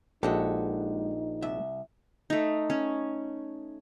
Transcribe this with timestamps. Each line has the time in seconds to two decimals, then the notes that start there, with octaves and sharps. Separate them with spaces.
0.23 A#1 G#3 D#4 F#4 G4 A4 F#5
1.42 C2 E5
2.30 A3 D#4
2.70 C#4